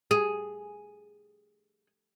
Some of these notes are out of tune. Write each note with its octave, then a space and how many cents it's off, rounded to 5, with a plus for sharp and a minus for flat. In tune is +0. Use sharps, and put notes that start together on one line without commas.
G#4 +0